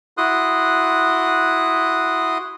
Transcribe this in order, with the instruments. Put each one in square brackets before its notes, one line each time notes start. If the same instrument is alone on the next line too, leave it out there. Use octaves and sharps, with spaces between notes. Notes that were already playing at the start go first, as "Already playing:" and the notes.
[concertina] E4 F#4 C6 D#6 F#6